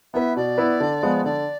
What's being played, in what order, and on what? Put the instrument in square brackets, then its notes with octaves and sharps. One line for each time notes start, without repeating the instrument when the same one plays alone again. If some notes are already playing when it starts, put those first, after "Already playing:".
[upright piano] B3 E4 B4 [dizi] E5
[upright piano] B2 [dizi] D5
[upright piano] B3 E4 B4
D3
F3 G#3 B3
[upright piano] D3 [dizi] D5